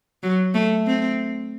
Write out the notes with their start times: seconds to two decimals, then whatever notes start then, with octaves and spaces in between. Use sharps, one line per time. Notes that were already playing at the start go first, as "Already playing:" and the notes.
0.23 F#3
0.54 A3
0.87 C4